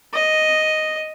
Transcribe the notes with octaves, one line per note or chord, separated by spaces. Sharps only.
D#5